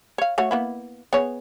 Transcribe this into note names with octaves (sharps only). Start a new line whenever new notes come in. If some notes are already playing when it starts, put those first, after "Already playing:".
C#5 F5
A3 F#4 C#5
A#3 B3 E4
B3 G#4 C#5